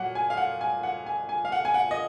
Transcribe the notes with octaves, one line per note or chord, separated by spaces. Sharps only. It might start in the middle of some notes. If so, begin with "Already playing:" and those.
Already playing: A#2 F#3 F#5
G#5
F5
F#5
G#5
F#5
G#5
G#5
F5
F#5
G#5
F#5
D#5